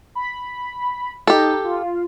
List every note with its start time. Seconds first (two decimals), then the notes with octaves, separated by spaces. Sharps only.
0.15 B5
1.27 D#4 G4 A4
1.64 F4